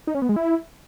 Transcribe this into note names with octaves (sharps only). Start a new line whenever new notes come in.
D#4
C#4
B3
G#3
E4